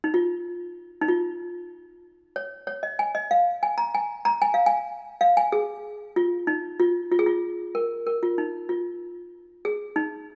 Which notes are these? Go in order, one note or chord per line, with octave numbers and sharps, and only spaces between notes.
D#4
F4
D#4
F4
C#5
C#5
D#5
G#5
D#5
F5
G#5
A#5
G#5
A#5
G#5
F5
G#5
F5
G#5
G#4
F4
D#4
F4
F4
G#4
F4
A#4
A#4
F4
D#4
F4
G#4
D#4